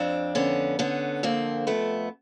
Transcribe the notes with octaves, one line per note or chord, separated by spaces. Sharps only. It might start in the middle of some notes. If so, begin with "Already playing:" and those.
Already playing: F2 C4 D4
D3 B3 C#4
D3 B3 C#4
F2 A#3 C4
F2 A3 B3